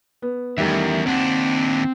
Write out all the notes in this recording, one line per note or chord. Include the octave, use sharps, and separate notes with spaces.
B3
E2 D#3 G3 A3 A#4 E5
D#2 C4 D4 F#5